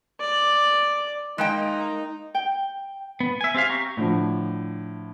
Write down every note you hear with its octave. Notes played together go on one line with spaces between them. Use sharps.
D5
G#3 A#3 D#4 G5
G5
B3
E5 G#5
C4 G4 E5 F5
G4 A#5 C#6
A2 D3 F3